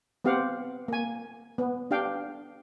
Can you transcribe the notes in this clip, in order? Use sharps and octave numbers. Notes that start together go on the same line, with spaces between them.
B3 C4 G4 F5 F#5
A#3 G#5
B3
D4 G4 F5 G5